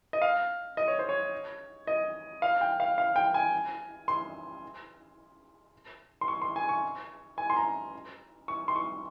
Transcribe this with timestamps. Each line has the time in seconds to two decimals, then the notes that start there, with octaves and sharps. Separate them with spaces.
0.13 D#5
0.22 F5
0.77 D#5
0.88 C#5
0.99 C5
1.09 C#5
1.87 D#5
2.42 F5
2.61 G5
2.80 F5
2.98 F5
3.16 G5
3.34 G#5
4.08 C6
6.21 C6
6.28 C#6
6.42 C6
6.56 G#5
6.69 C#6
7.38 G#5
7.50 C6
7.57 A#5
8.48 C#6
8.68 C6
8.76 C#6